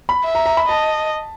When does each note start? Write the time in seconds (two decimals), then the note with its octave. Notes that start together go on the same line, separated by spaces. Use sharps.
0.09 B5
0.24 E5
0.35 A#5
0.46 A#5
0.57 B5
0.69 D#5 A5